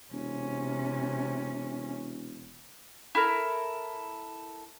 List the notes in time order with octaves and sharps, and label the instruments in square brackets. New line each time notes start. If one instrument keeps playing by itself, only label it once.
[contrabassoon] E1 [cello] C3 C#4
[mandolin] E4 A4 A#4